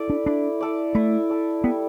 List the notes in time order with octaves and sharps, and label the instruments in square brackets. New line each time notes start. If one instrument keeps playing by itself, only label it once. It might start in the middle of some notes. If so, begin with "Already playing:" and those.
Already playing: [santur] E4 A4 D5
[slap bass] D4
[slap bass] D4 [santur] E4
[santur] A4 D5
[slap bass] A3 [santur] E4
[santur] A4 D5
[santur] G3 [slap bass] B3